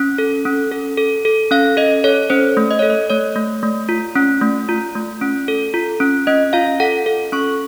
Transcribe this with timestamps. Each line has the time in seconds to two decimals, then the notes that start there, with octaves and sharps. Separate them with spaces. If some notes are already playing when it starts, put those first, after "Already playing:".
Already playing: C#4
0.18 A4
0.46 C#4
0.72 A4
0.97 A4
1.25 A4
1.51 C#4 F5
1.77 A4 D#5
2.04 A4 C#5
2.30 C#4 C5
2.57 A3
2.71 D#5
2.79 A4 C#5
2.90 D#5
3.10 A3 C#5
3.36 A3
3.63 A3
3.89 F4
4.16 C#4
4.41 A3
4.69 F4
4.95 A3
5.21 C#4
5.48 A4
5.74 F4
6.00 C#4
6.27 C#4 D#5
6.53 F4 F5
6.80 A4 F#5
7.06 A4
7.32 C#4 C#6